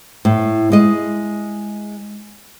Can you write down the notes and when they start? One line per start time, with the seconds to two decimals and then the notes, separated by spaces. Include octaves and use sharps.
0.25 A2
0.72 G#3 D#5